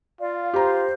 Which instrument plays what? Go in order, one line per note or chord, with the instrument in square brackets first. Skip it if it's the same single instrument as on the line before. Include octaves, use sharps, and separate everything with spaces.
[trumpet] F4 [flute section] D5 F5
[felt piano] G4 A#5 [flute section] C5